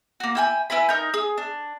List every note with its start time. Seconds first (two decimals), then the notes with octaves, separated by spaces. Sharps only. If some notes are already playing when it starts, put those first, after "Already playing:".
0.20 A#3 F#4
0.35 E4 G5 G#5
0.70 E4 B4 G#5 B5
0.89 D#4 A#4 G6
1.14 G#4
1.38 D4